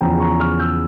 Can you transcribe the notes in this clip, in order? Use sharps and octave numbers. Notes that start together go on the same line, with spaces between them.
E2 C#3 F3 G5 A#5
A#5 C#6
C#6 F6
E6 G6